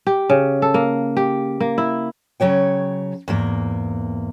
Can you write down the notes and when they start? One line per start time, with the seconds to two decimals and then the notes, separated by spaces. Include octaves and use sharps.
0.07 G4
0.30 C#3
0.62 A4
0.74 A#3
1.17 G4
1.60 A#3
1.78 E4
2.40 C#3 F#3 C#5 G5
3.28 E2 G#2 A#3